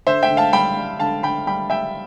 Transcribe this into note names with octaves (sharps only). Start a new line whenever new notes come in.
D3 C5 E5
E5 G5
D3
F5 A5
G3 G5 B5
G3
D3 F5 A5
D3 G5 B5
G3 G5 B5
G3 E5 G5